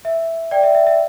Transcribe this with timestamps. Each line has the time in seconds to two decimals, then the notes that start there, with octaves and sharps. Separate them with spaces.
0.05 E5
0.51 D5 G5
0.63 E5
0.75 E5
0.87 E5